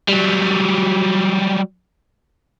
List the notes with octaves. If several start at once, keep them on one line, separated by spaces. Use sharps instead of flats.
F#3 G3